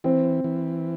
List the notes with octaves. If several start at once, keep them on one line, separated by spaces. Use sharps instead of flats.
E3 C4
E3